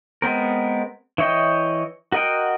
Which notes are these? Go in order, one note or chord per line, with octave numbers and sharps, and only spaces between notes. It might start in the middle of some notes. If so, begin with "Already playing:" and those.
G#3 B3 C4 A#4
E3 E4 C#5 D#5 G5
F#4 A#4 D#5 F#5 G5